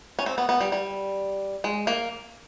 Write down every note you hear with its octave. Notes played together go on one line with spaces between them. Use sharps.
C#4
C4
B3
B3
G3
G3
G#3
A#3